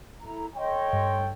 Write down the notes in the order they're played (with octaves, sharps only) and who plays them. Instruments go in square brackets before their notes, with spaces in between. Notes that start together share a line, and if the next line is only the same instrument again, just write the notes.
[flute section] E4 A4 A#5
[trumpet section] A4 C#5 G5 [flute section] D#5 C6
[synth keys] G2